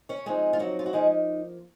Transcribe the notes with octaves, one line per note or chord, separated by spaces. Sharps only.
C#4 C#5
F3 G#3 C4 D#4 G#4
F4
F#3 F#4
F4
F#4
F3 G#3 A#3 D#4 G#4